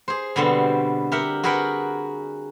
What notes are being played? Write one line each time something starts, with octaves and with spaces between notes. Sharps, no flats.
G#4 C5
B2 D3 G3 B3 C4
G4 A#4 E5 F#5
F#4 G#4 A#4 B4 F#5 G5